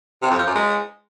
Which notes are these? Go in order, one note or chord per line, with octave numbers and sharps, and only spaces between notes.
C3
F2
F3
F#2
G#3